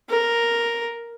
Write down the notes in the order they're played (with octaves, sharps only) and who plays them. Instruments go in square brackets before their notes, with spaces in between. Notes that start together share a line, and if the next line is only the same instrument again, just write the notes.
[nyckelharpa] A#4